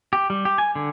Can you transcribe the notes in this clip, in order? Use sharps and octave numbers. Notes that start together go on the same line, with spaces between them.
G4
G3
G4
G#5
D3